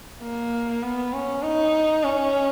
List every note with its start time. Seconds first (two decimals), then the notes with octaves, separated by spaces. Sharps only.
0.22 A#3
0.83 B3
1.13 C#4
1.43 D#4
2.04 C#4